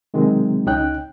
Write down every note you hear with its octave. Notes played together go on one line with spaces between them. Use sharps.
C3 D#3 F#3 G#3 C4
C#2 C#3 C#4 D#4 G5 F#6